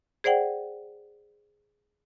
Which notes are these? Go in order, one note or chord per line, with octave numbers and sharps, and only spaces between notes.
G#4 C5 D5 F#5 G5